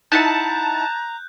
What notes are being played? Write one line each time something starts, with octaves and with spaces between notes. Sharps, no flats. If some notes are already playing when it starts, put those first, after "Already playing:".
D#4 E4 F#5 A5 A#5 F#6 G6